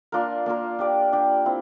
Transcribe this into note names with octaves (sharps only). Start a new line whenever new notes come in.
A#3 D4 F4 A#4
A#3 D4 F4 A#4
D4 G4 D5
D4 G4 D5
C4 E4